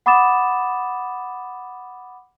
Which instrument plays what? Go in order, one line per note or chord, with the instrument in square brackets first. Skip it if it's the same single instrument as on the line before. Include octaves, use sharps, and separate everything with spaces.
[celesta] F#5 B5 D6 D#6 A6 E7